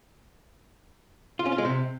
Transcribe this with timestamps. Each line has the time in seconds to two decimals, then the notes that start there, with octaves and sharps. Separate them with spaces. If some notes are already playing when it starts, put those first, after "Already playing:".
1.39 F4
1.46 C#4
1.52 F4
1.58 G#3
1.65 C3